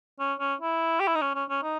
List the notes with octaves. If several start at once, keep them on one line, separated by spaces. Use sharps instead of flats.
C#4
C#4
E4
G4
E4
D#4
C#4
C#4
C#4
D#4